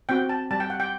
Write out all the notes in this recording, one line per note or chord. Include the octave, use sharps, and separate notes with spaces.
C4 F#4 G5
A5
G3 A5
G5
F#5
G5